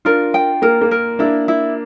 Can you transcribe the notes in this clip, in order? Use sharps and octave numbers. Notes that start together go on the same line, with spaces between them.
D4 F4 A#4
G5
A#3 A#4
A#3
A#4
A#3 D4 E4
E4